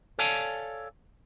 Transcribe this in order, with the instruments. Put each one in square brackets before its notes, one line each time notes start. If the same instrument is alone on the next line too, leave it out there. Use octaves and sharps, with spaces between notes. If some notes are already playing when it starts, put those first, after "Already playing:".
[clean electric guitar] A4 C#5 D5 F5 G#5 A5